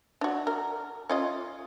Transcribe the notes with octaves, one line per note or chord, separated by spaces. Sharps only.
D4 F#4
A#4
C#4 F4 D#5